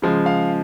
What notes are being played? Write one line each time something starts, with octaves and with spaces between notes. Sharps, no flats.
C#3 F3 G#3
F5